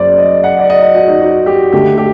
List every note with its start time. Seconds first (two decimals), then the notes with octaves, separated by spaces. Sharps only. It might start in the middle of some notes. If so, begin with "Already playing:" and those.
Already playing: F#1 F#2 F#3 C5 D5
0.18 D#5
0.44 F#5
0.59 D5
0.70 D#5
0.82 D#5
0.95 F#4
1.08 D#4
1.21 F#4
1.46 G4
1.73 D2 D3 A3 G4
1.98 G4